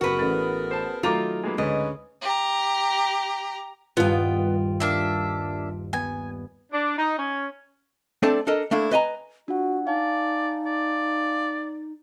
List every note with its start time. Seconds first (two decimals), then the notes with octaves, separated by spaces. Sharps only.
0.01 F#1 B3 F#4 G#4 A#4 B4 C#6
0.19 A1 A3 A6
0.71 C5 A5
1.03 D#3 F#3 A3 D#4 F4 A#5 D6
1.44 G#3 A#3 B3
1.58 D2 G#2 C#3 C#4 B4 D#5
2.22 G4 A#5
3.97 D#1 G2 B3 F4 G5 D#7
4.80 A#3 D4 E5
5.93 B3 G#5
6.72 D4
6.97 D#4
7.18 C#4
8.22 A3 C4 D4 A4 D5 A5
8.47 D4 A4 A#4 D#5
8.71 A3 A#3 D4 E4
8.91 B4 D#5 G#5 A#5
9.48 D4 F4 F#4 F#5
9.87 D#4 D5 F5 G#5 A5
10.66 D5